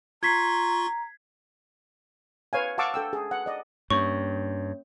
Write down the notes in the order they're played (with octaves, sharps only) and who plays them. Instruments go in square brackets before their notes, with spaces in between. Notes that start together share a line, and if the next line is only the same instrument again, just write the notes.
[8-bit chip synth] F4 C6 C#6 [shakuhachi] A#5 [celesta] G#6 B6 C7
[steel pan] B4 C#5 F5 G#5
F5 F#5 A5 C#6 D6 E6
A4 G5 E6
G#4
F#5
D5 D#5
[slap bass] G2 [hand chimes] A#3 C#4 C#5 [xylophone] C#6